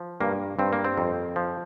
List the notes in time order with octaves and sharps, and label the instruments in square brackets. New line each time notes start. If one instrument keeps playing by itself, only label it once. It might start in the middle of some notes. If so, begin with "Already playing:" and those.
Already playing: [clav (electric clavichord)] F3
G2 A#3
G2 C4
A#3
C4
F2
F3